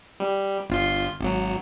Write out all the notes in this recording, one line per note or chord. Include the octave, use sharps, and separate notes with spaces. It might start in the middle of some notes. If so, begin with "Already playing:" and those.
G3
G1 F4 C6
G#1 F#3